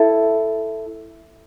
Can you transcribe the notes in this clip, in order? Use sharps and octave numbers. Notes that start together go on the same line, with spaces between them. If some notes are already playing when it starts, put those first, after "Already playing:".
Already playing: E4 A4